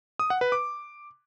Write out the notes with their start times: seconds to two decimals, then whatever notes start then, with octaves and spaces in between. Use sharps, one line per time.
0.19 D#6
0.30 F#5
0.41 B4
0.52 D6